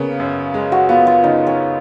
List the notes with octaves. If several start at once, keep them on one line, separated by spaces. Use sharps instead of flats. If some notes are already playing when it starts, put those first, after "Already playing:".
Already playing: C#3 A#3 B3
F#2
G#3
F#4
B3 F4
F4
C#3 D#4
C#4